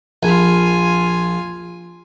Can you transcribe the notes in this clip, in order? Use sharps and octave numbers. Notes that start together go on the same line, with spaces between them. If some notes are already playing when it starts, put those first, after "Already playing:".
A#1 F4 G#5